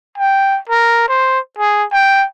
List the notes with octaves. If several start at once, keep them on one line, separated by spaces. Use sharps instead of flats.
G5
A#4
C5
G#4
G5